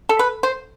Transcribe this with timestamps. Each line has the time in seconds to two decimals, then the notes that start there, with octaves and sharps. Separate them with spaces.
0.09 A4
0.19 B4
0.43 C5